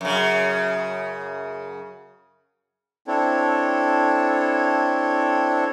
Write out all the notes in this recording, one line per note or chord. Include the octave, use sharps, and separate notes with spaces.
F#2 C#3
C4 D4 E4 A4 C#5